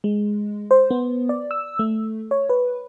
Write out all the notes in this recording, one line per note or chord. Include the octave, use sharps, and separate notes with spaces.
G#3
C5
B3
D5
E6
A3
C#5
B4